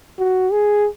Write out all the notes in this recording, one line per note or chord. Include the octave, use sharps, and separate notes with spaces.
F#4
G#4